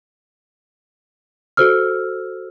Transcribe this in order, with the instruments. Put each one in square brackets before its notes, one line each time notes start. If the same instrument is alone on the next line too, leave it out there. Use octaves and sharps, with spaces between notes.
[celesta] F#4 A4 C5 E6 F6